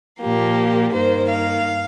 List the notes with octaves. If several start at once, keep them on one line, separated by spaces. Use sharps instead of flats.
A#2 F3 A#3 G4
G2 D#3 A#3 C5
F5